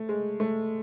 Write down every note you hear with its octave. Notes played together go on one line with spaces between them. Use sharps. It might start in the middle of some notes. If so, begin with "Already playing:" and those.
Already playing: A3
G#3
A3